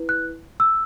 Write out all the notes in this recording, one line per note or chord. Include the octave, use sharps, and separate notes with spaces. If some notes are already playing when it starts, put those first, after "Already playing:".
Already playing: E4 B4
F#6
E6